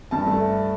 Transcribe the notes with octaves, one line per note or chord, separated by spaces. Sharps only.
G2 A5
A3